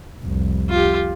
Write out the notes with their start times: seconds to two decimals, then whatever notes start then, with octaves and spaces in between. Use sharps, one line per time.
0.21 F1 C2
0.70 F4 G4